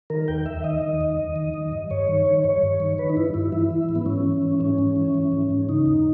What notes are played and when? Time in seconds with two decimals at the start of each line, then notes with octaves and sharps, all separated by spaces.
0.10 D#3 A#4
0.28 D#2 G5
0.46 D#2 E5
0.64 D#3 D#5
0.82 D#3
1.01 D#2
1.19 D#2
1.36 D#3
1.54 D#3
1.72 G2
1.90 G2 C#5
2.08 D#3
2.26 D#3
2.44 G2 C#5
2.62 G2
2.80 D#3
2.98 D#3 B4
3.09 D#4
3.17 G2 E4
3.34 G2 E4
3.52 E3 E4
3.71 E3
3.89 G#2
3.95 B3
4.06 G#2 C#4
4.25 E3
4.42 E3
4.60 G#2 C#4
4.78 G#2
4.96 E3
5.14 E3
5.32 G#2
5.51 G#2
5.69 C#3 D#4
5.86 D#2